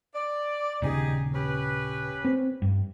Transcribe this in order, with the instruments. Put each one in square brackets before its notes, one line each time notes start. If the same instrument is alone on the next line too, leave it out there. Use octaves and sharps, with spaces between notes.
[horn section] D5
[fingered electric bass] D#1 C#3 [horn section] D#4 G4 G#4
[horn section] C#4 G4 B4
[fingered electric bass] C4
G2